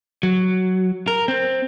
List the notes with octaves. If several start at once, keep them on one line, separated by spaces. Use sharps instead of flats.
F#3
A#4
C4